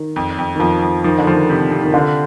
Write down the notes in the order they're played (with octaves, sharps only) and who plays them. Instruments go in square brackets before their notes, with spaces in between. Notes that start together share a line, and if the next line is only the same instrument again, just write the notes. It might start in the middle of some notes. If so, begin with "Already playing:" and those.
Already playing: [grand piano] D#3
[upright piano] F2
F2
[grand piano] D#3
[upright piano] F2 [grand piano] F3
[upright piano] F2
[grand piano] D#3 [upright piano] F3
[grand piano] D3
[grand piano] D#3 [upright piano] F3
[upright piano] C3
C3
[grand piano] D#3
[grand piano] D3 [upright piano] F4